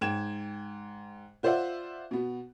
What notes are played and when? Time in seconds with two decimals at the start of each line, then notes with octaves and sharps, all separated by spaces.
0.01 G#2 G5 G#6 E7
1.43 F4 C5 D5 E5 F#5
2.11 B2 B3